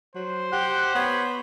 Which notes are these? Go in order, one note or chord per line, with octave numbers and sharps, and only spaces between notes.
F#3 C5
G4 F#5
B3 C#5